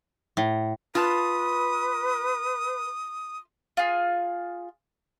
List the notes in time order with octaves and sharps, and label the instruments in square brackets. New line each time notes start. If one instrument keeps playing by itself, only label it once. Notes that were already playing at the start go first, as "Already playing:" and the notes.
[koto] A2
[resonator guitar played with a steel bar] F4 A5 [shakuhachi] B4 [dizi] D#6
[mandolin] F4 G#4